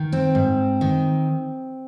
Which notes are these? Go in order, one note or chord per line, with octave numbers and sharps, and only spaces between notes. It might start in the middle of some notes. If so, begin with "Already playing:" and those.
Already playing: D#3
C4
G#2
D#3